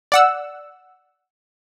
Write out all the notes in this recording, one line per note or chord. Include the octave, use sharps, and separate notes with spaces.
D5 F#5 E6